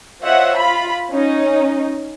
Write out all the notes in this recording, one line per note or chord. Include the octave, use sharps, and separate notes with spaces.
F4 C5 C#5 D#5 E5 F#5
F4 B5
C#4 D#4